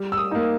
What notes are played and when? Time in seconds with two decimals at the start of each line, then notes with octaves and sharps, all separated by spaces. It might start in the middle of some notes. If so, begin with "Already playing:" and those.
Already playing: G3
0.12 E6
0.17 D#6
0.31 A#3 D#4